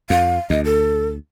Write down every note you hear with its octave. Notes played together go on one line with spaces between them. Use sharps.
F2 F5
D2 D#5
A4